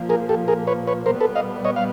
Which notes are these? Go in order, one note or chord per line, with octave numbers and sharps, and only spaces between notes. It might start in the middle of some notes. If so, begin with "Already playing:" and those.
Already playing: A#2 F3 A#3
G#4 A#4
G4 A4
G#4 A#4
B4 C#5
B4 C#5
A#2 G3 B3 A#4 C5
A4 B4
D#5 F5
C#5 D#5
F5